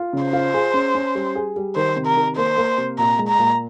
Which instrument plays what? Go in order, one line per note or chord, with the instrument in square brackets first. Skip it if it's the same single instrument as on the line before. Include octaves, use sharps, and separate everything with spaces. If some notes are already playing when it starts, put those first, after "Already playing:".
Already playing: [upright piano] F4
C#3
[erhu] C5
[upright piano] F4
G#4
C#4
C#4
G3
G#4
G3
[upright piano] D#3 [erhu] C5
[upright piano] C3
[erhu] A#4
[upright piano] D#3
[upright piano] A#3 [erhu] C5
[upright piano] A#3
C3
[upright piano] A#2 [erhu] A#5
[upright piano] G#3
[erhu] A#5
[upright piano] A#2